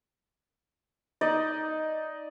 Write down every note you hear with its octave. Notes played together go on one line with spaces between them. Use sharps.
D#4 D5 D#5